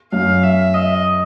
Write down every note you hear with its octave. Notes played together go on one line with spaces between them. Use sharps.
F#2 F5
E5
D#5